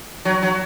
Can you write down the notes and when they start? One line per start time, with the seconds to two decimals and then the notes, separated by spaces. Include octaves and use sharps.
0.25 F#3
0.42 F#3